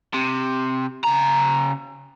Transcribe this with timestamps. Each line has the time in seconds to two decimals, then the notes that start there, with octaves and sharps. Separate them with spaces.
0.14 C3
1.04 C#3 A#5